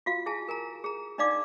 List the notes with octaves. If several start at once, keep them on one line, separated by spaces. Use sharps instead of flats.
F4 F#4 F5
E4 G#4 G#5 A5
A#4 G#5 A#5
G#4 A#5
D4 D#4 D5 F5 D6